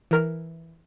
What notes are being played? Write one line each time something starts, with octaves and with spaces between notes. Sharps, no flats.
E3 A#4 F6